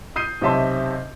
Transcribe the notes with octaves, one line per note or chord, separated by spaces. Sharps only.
D#6 G6 C7 D#7
B1 C3 C#5 E5 A5 C6